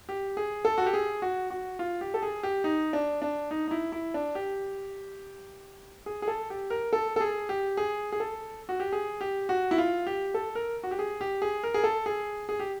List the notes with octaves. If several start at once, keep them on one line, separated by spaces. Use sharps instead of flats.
G4
G#4
A4
F#4
G4
G#4
F#4
F#4
F4
G4
A4
G#4
G4
D#4
D4
D4
D#4
D#4
E4
E4
D4
G4
G#4
G#4
A4
G4
A#4
A4
A4
G#4
G4
G#4
G#4
A4
F#4
G4
G#4
G4
F#4
E4
F4
G4
A4
A#4
F#4
G4
G#4
G4
G#4
A#4
G#4
A4
G#4
G#4
G4